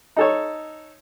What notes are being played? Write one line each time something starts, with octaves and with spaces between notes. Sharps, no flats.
D#4 A4 C#5